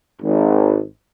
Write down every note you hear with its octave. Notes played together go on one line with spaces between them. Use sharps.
G#1